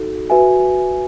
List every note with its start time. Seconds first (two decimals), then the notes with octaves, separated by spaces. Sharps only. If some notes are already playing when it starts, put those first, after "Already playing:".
Already playing: D#4 F#4 A4
0.30 F#4 B4 E5 G#5